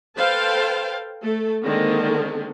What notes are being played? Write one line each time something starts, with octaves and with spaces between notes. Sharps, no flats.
A4 B4 C5 F5 G5 A5
A3 A4
D3 D#3 G#3 A#3 C4